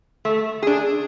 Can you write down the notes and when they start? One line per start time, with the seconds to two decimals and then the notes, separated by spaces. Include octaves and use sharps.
0.25 A3
0.62 D4 G#4